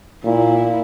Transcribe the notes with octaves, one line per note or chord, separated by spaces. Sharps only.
A#2 E4